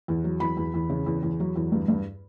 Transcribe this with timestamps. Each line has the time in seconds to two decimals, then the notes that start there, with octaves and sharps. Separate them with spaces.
0.08 E2
0.24 F#3
0.40 E2 B5
0.57 E2
0.74 E2
0.90 C#3
1.06 E2
1.23 E2
1.40 F#3
1.56 E2
1.72 G2
1.88 G2